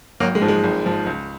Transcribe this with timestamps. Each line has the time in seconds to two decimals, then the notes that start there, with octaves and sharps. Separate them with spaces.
0.20 G#1 F#3 A#3
0.35 G#3
0.41 G#2 F3
0.48 G#3
0.64 G#1
0.86 G#2 F3
1.06 C#2